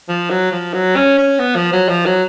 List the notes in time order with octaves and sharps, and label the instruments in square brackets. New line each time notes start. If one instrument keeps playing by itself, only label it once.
[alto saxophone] F3
F#3
F3
F#3
C#4
C#4
B3
F3
F#3
F3
F#3